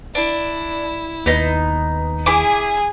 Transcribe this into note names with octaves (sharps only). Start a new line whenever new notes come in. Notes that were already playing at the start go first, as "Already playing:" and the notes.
D4 E4
D#2 B3 D#4
E4 G#4 G#5 D6